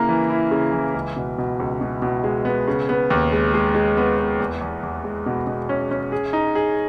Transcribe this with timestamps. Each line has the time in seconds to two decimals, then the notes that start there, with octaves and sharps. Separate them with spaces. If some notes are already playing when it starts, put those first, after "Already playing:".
Already playing: C#3 A#3 E4
0.09 E3
0.30 E4
0.51 C#3
0.73 E3
0.94 C#2
1.17 B2
1.38 B2
1.60 C#2
1.81 B2
2.02 B2
2.24 G#3
2.45 B3
2.67 C#3
2.89 B3
3.10 D#2
3.32 G#3
3.54 G#3
3.75 G#3
3.97 B3
4.19 B3
4.39 E2
4.61 E2
4.83 E2
5.04 G#3
5.26 B2
5.47 B2
5.69 C#4
5.91 C#4
6.12 G#4
6.33 D#4
6.55 G#4